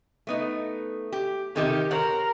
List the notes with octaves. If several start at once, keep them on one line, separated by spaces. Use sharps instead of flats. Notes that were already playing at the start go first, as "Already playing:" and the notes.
A3 B3 D#4
G4
C3 D#3 G4 A4
A#4 C5 C#5 F#5